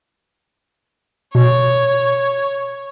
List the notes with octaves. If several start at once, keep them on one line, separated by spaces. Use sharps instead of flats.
B2 C#5